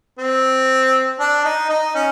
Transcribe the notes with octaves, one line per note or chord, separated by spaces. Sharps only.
C4
D4
D#4
D#4
C#4